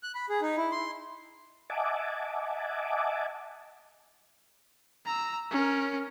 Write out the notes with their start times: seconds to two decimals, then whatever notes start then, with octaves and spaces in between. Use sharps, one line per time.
0.03 F#6
0.15 B5
0.29 G#4
0.42 D#4
0.57 E4
0.72 C6
1.70 D#5 E5 F#5 G#5 A5 D6
5.05 A#5 E6
5.50 C#4 A#4